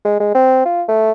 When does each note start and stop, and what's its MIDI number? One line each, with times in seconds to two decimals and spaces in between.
0.05 0.17 56
0.20 0.33 56
0.35 0.63 60
0.65 0.83 65
0.88 1.11 57